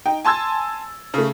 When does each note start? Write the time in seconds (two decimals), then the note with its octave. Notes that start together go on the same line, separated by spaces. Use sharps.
0.05 D#4 G5
0.25 G#5 A5 C6 E6 G#6 A6
1.14 C#3 A3